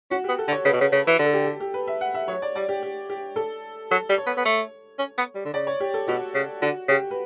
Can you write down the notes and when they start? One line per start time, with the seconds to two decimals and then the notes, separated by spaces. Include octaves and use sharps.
0.11 C#4 F#4
0.24 B3 G4
0.38 A4
0.48 D3
0.52 C#5
0.65 C#3 B4
0.73 B2
0.81 C#3
0.92 C#3
1.07 E3
1.19 D3
1.26 A4
1.33 G4
1.47 G4
1.60 G4
1.74 B4
1.87 E5
2.01 F#5
2.14 E5
2.28 F#3 C#5
2.42 D5
2.55 G3 D5
2.69 G4
2.83 G4
3.10 G4
3.36 A4
3.91 F#3 A4
4.09 G3
4.18 C#5
4.26 B3
4.37 B3
4.45 A3
4.99 C#4
5.18 B3
5.35 G3
5.45 D3
5.54 C#3 D5
5.67 C#5
5.80 G4
5.94 A4
6.08 B2 F#4
6.34 C#3
6.62 D3 F#4
6.88 C#3 G4
7.11 B4